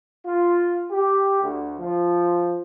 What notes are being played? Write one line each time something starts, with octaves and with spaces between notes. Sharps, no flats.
F4
G4
D2
F3